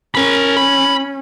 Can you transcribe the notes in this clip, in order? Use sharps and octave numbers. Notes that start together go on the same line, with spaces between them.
C#4 A#4 B5
B5